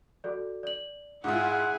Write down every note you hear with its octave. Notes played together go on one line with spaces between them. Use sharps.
F#4 A4 D5
D5 F#7
G#2 E4 F4 G#4 F#5